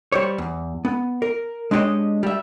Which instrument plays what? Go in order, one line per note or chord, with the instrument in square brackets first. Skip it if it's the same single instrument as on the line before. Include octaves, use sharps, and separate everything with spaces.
[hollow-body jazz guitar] G3 C5 C#5
E2
B3
A#4
G#3 D4 E4 G4 C#5 D#5
G3 E5